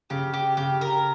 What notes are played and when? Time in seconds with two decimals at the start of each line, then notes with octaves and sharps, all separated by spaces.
0.10 C#3 G4
0.34 G4
0.57 C#3 G4
0.81 A#4